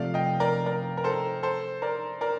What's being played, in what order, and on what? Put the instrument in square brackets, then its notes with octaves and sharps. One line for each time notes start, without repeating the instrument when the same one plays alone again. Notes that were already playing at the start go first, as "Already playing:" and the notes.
Already playing: [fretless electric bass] C3 F3 A3 [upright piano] D5 F5
[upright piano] D#5 G5
A#4 D5
A#4 D5
A#4
A4 C5
A4 C5
A#4 D5
A#4 D5